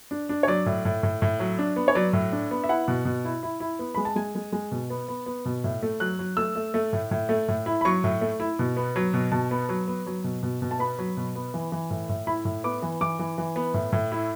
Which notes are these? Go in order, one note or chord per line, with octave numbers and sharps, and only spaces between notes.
D4
D4
C#5
F#3 D5
A2
A2
A2
A2
F#3
D4
B3
C#5
F#3 D5
A2
D4
B3
E5
E4 F#5
B2
B2
E4
E4
E4
B3
G#3 B5
A5
G#3 G#5
G#3
G#3
B2
B3
B3
B3
B2
A2
A3
F#3 F#6
F#3
A3 E6
A3
A3
A2
A2
A3
A2
E4
B5
F#3 C#6
A2
A3
E4
B2
B3
F#3
B2
B2 A5
B3
F#3
B3
F#3
B2
B2
B2
A5
B3 B5
F#3
B2
B3
E3
E3
A2
A2
E4 B5
A2
B3 D6
E3
E3 D6
E3
E3
B3
A2
A2
E4